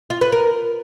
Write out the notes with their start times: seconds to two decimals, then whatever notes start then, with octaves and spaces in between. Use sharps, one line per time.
0.10 F4
0.21 B4
0.32 A#4